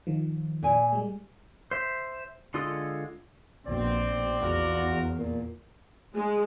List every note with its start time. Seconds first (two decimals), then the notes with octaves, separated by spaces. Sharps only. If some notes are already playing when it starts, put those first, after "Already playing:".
0.07 D#3 F3
0.63 A#2 G#5
0.93 G3 G#3
1.71 C5 E5
2.54 D3 G#3 F4 A4 D#6
3.66 A#1 B2 C4 D5
4.41 E2 F4 F#4 A#4
5.18 A#2
6.15 G#3